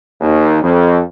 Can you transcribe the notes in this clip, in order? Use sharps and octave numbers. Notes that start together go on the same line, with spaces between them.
D#2
F2